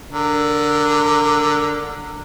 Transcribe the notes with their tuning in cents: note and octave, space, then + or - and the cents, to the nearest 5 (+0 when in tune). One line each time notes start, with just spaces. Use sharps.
D3 +0 A#4 -25